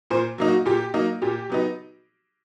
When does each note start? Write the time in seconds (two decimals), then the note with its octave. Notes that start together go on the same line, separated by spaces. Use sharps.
0.11 A#2 C5
0.38 F#3 A#3 D#4
0.48 F#4
0.66 A#2 G4
0.94 F#3 A#3 D#4
1.22 A#2 G4
1.50 F#3 B3 D#4